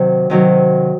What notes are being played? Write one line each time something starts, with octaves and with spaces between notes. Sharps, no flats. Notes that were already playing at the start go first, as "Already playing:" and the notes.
Already playing: C3 D#3 F#3
C3 D#3 F#3